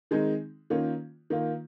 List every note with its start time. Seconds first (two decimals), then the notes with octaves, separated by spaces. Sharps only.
0.11 D#3 G#3 C4 D#4
0.70 D#3 A#3 C#4 F4
1.30 D#3 A#3 F4